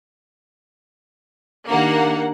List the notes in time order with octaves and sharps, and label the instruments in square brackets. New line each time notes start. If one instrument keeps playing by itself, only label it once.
[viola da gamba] D#3 D4 G4 [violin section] A#3 F#5